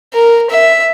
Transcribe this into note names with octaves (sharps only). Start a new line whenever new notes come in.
A#4
E5